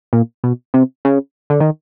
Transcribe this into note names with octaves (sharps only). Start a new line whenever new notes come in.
A#2
B2
C3
C#3
D3
D#3